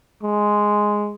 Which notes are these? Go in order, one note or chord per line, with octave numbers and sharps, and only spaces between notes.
G#3